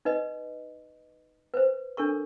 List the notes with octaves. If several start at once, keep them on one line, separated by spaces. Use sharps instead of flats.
D#4 B4 D#5
B4 C5
D4 A4 A#4 C#6